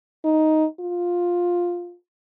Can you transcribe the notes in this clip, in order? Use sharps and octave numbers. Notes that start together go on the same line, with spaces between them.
D#4
F4